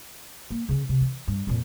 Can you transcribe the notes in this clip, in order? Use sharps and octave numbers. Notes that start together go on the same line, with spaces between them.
A#3
C#3 C#4
C3
E3
G2
F2 A#2